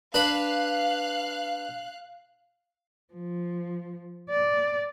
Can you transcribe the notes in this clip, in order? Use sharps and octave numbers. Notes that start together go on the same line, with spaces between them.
D4 B4 F5 B5 F#6
F3
D5